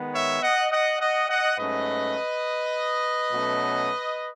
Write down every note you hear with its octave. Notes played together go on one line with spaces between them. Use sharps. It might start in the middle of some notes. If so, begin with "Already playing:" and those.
Already playing: D#3 G#3 B3
C#5 E5
D#5 F#5
D#5 F#5
D#5 F#5
D#5 F#5
G#2 F#3 A3 C#4 B4 D#5
B2 F#3 A3 C#4